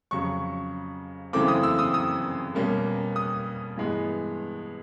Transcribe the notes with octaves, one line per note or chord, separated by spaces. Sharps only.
F2 C#3 F#3 C#6
F#2 C#3 E3 A3 C4 D6
D#6
E6
D#6
D#6
B2 G3 A#3 C#4
D#6
G2 E3 G#3 B3